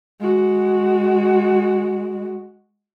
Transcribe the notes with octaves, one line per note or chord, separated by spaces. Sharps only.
G#3 F#4